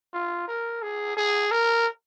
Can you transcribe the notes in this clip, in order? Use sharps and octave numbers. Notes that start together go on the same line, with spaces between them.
F4
A#4
G#4
G#4
A#4